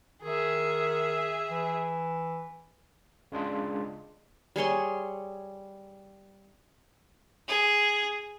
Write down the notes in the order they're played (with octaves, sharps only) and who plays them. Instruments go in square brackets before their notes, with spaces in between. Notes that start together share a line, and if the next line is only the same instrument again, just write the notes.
[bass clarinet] D#3 [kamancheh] G#4 E5
[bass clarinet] E3
[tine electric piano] C#3 G#3 D4 F4
[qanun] G3 G#4 C#5 C6
[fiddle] G#4